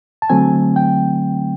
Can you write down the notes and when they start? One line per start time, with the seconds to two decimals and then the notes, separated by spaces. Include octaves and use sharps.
0.22 A5
0.30 D3 F#3 A3 C4 G#5
0.76 G5